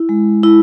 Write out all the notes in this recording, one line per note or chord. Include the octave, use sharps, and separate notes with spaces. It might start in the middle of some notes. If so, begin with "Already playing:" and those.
Already playing: E4
G#3
E4